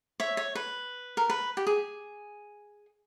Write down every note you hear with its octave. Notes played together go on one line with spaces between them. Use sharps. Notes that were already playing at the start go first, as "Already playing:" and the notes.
C#5 E5
C#5
B4
A#4
B4
G4
G#4